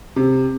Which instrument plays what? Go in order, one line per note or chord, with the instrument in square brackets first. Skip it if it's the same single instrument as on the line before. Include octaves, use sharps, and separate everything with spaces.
[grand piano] C3